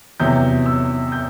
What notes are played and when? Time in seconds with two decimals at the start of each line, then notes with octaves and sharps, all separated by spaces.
0.20 E2 C3 F#3 G6
0.66 E6
1.12 G6